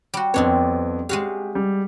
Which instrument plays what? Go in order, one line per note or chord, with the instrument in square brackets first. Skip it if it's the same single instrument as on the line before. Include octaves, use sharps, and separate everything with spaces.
[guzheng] G3 F#4
[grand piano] F2 B3 [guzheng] C4 D4 C#5
[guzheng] G#3 F#4 F5 [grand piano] G4
[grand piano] G3